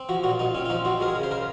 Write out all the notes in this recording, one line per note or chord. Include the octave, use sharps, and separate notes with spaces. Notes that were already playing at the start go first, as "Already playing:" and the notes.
Already playing: C4
F3 F#4
A#2 F#4
A#2 D#4
C4 C#4
F4
F3 D#4
C4 F#4
G#3 A#4
G#4
C#3
C5
C#3 A#4